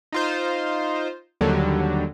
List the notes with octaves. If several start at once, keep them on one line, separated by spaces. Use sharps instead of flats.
D#4 F4 C5
D#2 D3 F#3 G3